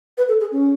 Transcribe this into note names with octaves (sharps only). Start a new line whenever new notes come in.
B4
A4
G#4
C#4